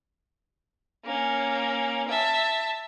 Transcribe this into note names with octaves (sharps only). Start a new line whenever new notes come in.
A#3 C#4
E5 A5